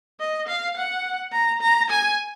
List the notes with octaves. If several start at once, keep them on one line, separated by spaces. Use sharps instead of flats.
D#5
F5
F#5
A#5
A#5
G#5